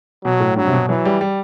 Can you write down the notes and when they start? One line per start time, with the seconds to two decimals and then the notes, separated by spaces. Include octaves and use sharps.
0.24 B2 F#3
0.40 A2
0.56 G2 F#3
0.66 C3
0.73 B2
0.89 E3 F#3
1.05 G3
1.21 G3